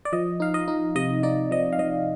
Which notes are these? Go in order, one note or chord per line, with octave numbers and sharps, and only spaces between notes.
D5
F3 D#5
D#4 F5
D#5
D#4
C3 D#5
D#4 D5
F3 D#5
F5
F3 D#5